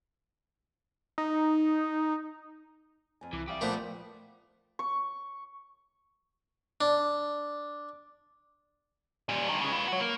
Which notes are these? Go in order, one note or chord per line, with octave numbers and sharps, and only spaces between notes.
D#4
F2 G#5
C2 E3 D6 G#6
G4 D5 E5 F5 D#6
A#2 F3 G3 A3 B3 A5 D6
C#6
D4
A#2 G3
G2 D#3
C#3 G#3
F4 B4
F#4 C#5
A#3